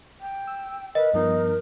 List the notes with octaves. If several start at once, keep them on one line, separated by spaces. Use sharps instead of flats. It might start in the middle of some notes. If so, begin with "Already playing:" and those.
G5
E6
A#4 B4 D#5
G2 F3 B3 D#4 A#4